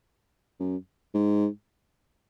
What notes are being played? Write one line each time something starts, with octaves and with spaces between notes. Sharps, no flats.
F#2
G#2